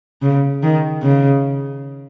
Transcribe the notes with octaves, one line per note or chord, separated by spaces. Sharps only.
C#3
D#3
C#3